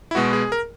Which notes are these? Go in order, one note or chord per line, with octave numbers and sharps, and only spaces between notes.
E4
B2 G#3 B3 F#4
G#4
A#4